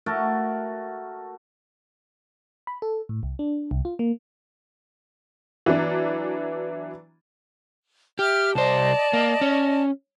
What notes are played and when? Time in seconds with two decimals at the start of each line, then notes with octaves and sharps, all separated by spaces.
0.06 A3 F#4 A#4 A5
2.67 B5
2.82 A4
3.09 A2
3.23 C2
3.39 D4
3.71 C2
3.85 F4
3.99 A#3
5.66 E3 F#3 B3 D4
8.19 G4 E5 F6
8.55 C2 C5 D5 D#5 A5
9.13 A#3
9.41 C#4